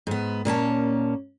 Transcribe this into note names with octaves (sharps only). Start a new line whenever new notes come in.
G#2 B3
A#2 A#3 C#4 A5